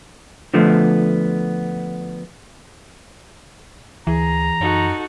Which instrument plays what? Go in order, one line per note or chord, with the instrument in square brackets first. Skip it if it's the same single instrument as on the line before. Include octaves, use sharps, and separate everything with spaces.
[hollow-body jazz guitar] D3 F3 A3 B3
[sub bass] D2 [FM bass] E3 [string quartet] G#4 [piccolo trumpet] A#5
[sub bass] F#2 [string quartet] D#4 F#4 A4